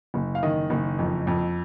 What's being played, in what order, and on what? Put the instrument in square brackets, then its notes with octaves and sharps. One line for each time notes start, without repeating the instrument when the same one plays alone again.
[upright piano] F#1
F5
D#3 D#5
F#1
F2
F2